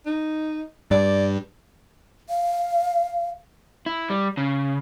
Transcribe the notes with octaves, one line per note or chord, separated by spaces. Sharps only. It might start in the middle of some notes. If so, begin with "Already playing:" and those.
D#4
G2 D5
F5
E4
G3
C#3